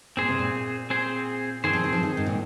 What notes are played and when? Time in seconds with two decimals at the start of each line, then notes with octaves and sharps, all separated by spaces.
0.17 A#2 C4 G#4 C5
0.29 C3
0.39 A#2
0.90 C4 G#4 C5
1.64 D#3 C4 G#4 C5
1.73 F3
1.84 D#3
1.93 F3
2.03 D#3
2.17 G#2
2.26 A#2